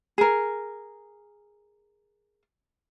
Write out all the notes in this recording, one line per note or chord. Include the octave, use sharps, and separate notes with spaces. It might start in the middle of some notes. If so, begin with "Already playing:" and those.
G#4 A#4